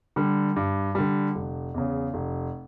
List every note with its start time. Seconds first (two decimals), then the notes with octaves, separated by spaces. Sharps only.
0.16 D3 G3
0.56 G2
0.95 D3 G3
1.35 F1
1.74 E2 C#3
2.14 F1